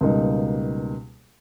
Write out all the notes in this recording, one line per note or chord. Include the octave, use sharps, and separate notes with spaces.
C#2 B2 G3 A#3 D#4